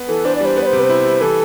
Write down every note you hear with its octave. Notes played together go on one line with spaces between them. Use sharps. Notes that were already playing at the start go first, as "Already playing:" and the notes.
Already playing: B3
E3 A4
D4 C5
D5
G3 C5
B3
D5
C5
C3
B4
C5
E4
G3
E3 A4